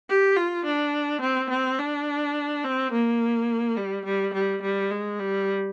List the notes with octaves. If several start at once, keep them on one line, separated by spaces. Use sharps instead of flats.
G4
F4
D4
C4
C4
D4
C4
A#3
G3
G3
G3
G3
G#3
G3